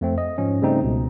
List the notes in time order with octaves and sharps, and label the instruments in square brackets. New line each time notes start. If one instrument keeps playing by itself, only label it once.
[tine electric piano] F2 A3 C4
D#5
G#2 F3 C#4
C#3 G3 A3 C4 D#4
C#2 B2